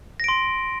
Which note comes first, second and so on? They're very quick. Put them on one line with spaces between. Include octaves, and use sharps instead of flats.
A#6 D7 C6